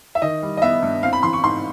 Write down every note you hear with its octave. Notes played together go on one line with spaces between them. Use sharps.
E5
D#3 D#5
G3
D#5
B3 E5
G2
C4 F5
B5
E3 C6
C#6
G#2 C6